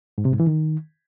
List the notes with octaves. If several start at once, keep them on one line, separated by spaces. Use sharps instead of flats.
G#2
C3
G#2
E3
D#3